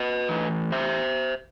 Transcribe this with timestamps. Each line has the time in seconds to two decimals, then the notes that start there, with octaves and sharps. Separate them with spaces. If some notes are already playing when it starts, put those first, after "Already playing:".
Already playing: B4 D#5
0.29 A2 E3
0.72 C5 E5